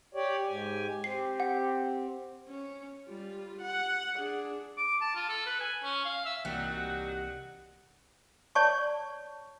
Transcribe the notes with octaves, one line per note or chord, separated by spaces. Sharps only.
G4 C#5 D5
G#2 G4 G#5
C4 G4 C7
F#5
C#4
G3 F4
F#5
D4 G#4
D6
A5
F4
A4
B4
G#5
C#4
F5
E5
C2 E3 F#3 G3 A#3 D#4 F#4 F#5
C#5 D5 A5 C#6